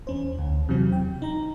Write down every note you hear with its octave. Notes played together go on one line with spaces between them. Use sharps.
E2 C#4 C5
D2
E2 C3 E3 F#3 C4
G5
D#4 A#5